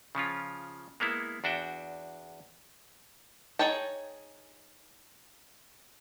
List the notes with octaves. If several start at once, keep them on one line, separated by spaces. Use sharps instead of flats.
C#3 F3 C#4 F4
G#3 A#3 B3 E4
E2 D4 F#4 E5 G5
D#4 G#4 C#5 G5 A5